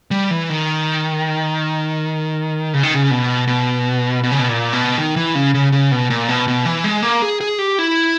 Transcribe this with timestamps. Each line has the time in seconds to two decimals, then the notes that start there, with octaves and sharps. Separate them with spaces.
0.11 G3
0.31 E3
0.50 D#3
2.74 C#3
2.83 D#3
2.94 C#3
3.11 B2
3.47 B2
4.23 B2
4.31 C#3
4.39 B2
4.48 A#2
4.73 B2
4.98 D#3
5.16 E3
5.35 C#3
5.54 C#3
5.72 C#3
5.92 B2
6.10 A#2
6.29 B2
6.48 B2
6.65 E3
6.84 G#3
7.03 A#3
7.22 G#4
7.41 G#4
7.59 G4
7.79 E4